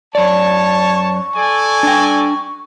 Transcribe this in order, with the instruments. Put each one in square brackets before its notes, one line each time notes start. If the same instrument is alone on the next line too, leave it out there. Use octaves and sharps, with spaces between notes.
[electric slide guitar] F#2 D5 [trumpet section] C#5 A5
[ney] C#6
[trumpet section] A4 D5 G#5
[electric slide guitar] D4 G5